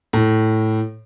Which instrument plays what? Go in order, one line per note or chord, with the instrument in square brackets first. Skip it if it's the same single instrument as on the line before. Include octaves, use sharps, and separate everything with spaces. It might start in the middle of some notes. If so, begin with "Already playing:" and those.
[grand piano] A2